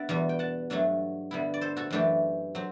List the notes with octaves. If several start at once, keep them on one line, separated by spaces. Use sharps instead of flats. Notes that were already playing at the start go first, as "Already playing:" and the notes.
Already playing: B3 D4 D5 E5 F#5
E2 B2 G3
G5
F#5 A5
G2 F#3 A3 D4
D3 G3 B3 E4
D5
A4 C5
F#4 A4
F#2 E3 A3 D4 G4
F#3 C4